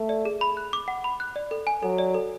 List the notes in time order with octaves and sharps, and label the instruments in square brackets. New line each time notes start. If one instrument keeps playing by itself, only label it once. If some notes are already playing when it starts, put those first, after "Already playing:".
Already playing: [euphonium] A3
[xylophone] D5
G#4
B5
F#6
D6
F#5
B5
F#6
D5
A4
G#5
[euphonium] F#3 [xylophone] A4
[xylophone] D5
A4